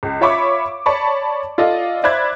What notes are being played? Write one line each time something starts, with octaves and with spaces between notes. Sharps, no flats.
C#2
F4 C#5 E5 B5 C#6 D6
C#5 D5 A5 B5 C#6
F4 A4 D5 D#5 F5
C5 D5 E5 B5 F#6 G#6